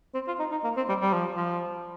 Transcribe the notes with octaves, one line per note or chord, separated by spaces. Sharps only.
C4
F4
D#4
D#4
A#3
C4
G3
G3
F3
F3